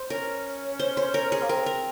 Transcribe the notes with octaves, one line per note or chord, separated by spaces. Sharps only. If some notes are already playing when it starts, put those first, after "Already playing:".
Already playing: C5
C#4 A#4
C5
C5
A#4
G#4
A#3
C4 A#4
A#4